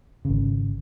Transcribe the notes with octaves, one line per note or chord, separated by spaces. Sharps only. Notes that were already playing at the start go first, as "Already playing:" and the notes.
G#1 C#3